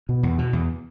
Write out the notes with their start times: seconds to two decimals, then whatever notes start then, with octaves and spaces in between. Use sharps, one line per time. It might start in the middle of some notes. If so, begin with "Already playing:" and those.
0.09 B2
0.23 E2
0.38 B2
0.53 E2